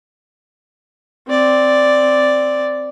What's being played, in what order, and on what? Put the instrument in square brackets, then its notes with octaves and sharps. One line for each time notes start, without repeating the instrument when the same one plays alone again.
[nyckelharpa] C4 D5